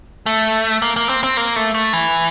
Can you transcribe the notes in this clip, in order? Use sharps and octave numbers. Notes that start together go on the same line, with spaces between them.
A3
A#3
A#3
C4
C4
A#3
A3
A3
E3